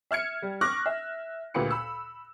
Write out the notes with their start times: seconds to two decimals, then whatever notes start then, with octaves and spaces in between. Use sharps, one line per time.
0.11 E5 F6 G#6 C#7
0.42 G3
0.61 C#6 D6 F6 F#6 A#6
0.86 E5
1.54 D2 A#2 G4 B4 C#7
1.71 B5 E6